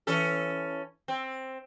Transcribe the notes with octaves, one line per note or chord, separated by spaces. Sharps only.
E3 C#4 A4
C4